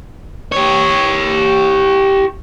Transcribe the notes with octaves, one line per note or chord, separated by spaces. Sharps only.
G4 C#5